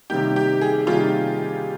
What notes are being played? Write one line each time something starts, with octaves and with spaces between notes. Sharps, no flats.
C3 D#3 G3 A#3 D#4 G4
G4
G#4
C3 D#3 G3 A#3 D#4 F4